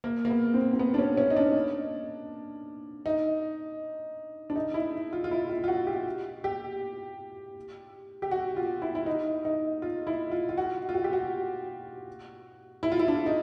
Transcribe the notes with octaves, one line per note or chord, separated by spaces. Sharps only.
A#3
A#3
B3
C4
C4
B3
D4
C#4
C#4
D#4
D4
D#4
D4
D#4
E4
F4
F4
E4
F4
F4
F#4
G4
G4
G4
F#4
F4
E4
E4
D#4
D#4
F4
E4
F4
F4
F#4
F4
F#4
G4
F#4
E4
F4
E4
D4
D#4